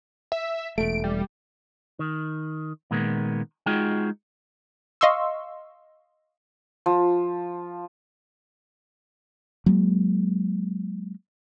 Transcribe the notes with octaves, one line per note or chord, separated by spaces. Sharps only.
E5
E1 A3 D7
G3
D#3
A#2 D#3 G#3 A#3 B3
G#3 D#4 F4 F#4 G#4 G5
D#5 F5 C6 C#6 E6
F3
F#3 G#3 A#3